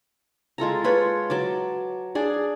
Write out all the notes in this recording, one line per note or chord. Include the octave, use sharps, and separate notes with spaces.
G#3 F4 A4 A#5
F4 B4 C#5
F#3 A5 D6
D4 G#4 D5